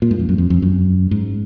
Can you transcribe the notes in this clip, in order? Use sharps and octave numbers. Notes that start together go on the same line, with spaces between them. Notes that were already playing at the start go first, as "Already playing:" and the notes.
A#2
G#2
F2
F#2
F2
F2
F#2
G#2